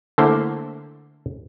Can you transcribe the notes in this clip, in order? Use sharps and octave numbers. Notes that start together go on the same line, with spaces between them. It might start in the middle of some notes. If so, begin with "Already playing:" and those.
D3 A3 A#3 E4 C5